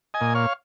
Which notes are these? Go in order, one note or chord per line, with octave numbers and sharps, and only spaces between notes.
D#5 G#5
A#2
C#5 F5